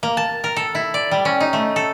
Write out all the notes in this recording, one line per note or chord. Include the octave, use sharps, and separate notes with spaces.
A#3
A5
A#4
A4
E4
D5
G3
C#4
D#4
A3
A4